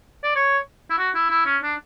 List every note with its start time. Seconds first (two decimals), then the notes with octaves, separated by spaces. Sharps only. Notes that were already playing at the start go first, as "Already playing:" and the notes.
0.24 D5
0.36 C#5
0.90 E4
0.98 F#4
1.15 E4
1.30 E4
1.46 C#4
1.63 D4